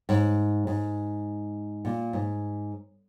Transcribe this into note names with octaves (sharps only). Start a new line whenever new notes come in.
G#2
G#2
A#2
G#2